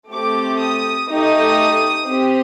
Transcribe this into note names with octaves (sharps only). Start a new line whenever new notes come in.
A3 C4 G4 D6
D#6
A3 D#4 G4 D#6
C4 G4